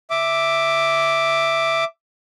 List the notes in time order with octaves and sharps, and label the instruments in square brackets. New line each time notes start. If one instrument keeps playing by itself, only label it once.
[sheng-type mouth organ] E5 D6